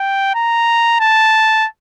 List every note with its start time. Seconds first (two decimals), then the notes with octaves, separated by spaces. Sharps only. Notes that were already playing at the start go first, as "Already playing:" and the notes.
Already playing: G5
0.35 A#5
1.00 A5